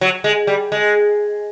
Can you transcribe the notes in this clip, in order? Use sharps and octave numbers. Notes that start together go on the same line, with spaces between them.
F#3
G#3
G3
G#3